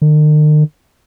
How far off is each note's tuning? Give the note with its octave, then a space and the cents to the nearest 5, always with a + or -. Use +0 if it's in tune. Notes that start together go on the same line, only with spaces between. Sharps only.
D#3 -45